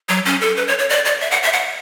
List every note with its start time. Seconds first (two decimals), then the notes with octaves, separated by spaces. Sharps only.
0.09 F#3
0.25 C#4
0.41 A4
0.57 B4
0.68 C#5
0.79 C#5
0.89 D5
1.05 D5
1.21 E5
1.31 F#5
1.43 E5
1.53 F#5